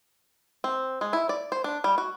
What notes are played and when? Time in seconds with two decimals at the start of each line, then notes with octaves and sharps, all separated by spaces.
0.64 C4
1.01 G#3
1.13 E4
1.29 D5
1.52 C5
1.64 D4
1.84 G3
1.98 F#4